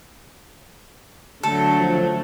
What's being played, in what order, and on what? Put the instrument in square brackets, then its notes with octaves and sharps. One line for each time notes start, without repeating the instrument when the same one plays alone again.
[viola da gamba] D3 F#3 [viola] A3 [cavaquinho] A4
[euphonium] F3